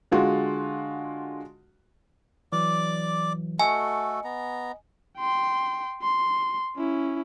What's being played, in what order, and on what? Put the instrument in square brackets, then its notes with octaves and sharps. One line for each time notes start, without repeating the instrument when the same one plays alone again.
[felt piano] D3 G#3 F4 F#4
[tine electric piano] E3 F#3 [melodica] D5 D6
[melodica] A3 F#4 A4 [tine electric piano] D#5 [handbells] G#5
[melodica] B3 A#5
[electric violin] G5 C6
C6
C#4 E4